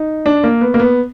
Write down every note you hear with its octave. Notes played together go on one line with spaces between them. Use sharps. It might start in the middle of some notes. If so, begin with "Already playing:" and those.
Already playing: D#4
D4
A#3
B3
A#3
B3